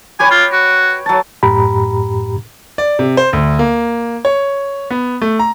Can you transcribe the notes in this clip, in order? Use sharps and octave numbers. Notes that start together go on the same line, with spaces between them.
G4 B4 C#5 G#5
F4
F#4
F#3 A5
F#2 A2 G4 A#5 B5
D5
C3
C5
D2
A#3
C#5
B3
A3
A#5